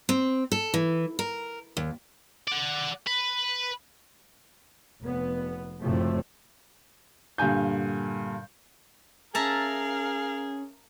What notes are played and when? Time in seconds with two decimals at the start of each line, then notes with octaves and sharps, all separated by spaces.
0.09 C4
0.52 A4
0.74 E3
1.19 A#4
1.77 D#2
2.48 D5 F#5
3.07 B4
5.02 F1 B3
5.81 F#1 F#2 A2 C3 F3 A3
7.38 G2 A#2 D3 G#5 G6
9.35 C#4 G#4 A#4 E5 F5 A5 A#5